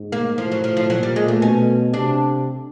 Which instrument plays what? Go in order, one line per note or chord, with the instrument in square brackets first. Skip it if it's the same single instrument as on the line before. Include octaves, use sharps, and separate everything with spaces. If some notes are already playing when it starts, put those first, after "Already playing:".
Already playing: [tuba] G#2
[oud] A#3
[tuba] A2 [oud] F3
[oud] F#3
F3
F3
[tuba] A#2 [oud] F#3
[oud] G3
G#3
A3
[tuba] B2 [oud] C#4
[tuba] C3 [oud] D4